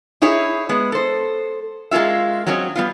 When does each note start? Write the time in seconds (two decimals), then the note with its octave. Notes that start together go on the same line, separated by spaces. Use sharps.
0.22 D#4 E4 G#4 C#5
0.69 G#3 B3
0.92 A4 C5
1.91 G#3 A#3 C#4 F4 E5
2.47 F#3 C4 C#4 C#5 D#5
2.76 G3 B3 F4